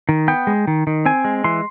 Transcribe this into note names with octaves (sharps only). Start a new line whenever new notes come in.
D#3
B3 G5
G#3
D#3
D#3
C4 G#5
G#3
E3 C6